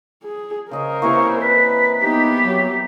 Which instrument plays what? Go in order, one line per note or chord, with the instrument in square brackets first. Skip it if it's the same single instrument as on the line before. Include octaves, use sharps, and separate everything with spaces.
[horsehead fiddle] G#4
[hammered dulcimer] C#3 D#5 C#6 [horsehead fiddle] A#4 C5
[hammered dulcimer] C3 E3 A#3 [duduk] E4 [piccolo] C#6
[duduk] B4 [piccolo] B6
[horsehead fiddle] B3 G4 [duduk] D#4
[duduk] F#3